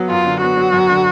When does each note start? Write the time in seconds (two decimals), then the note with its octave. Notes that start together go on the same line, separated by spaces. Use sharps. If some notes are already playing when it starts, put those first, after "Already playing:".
Already playing: F#3 B3
0.10 F#2 F4
0.25 D3
0.42 B3 F#4
0.57 F#3
0.73 F#2
0.89 D3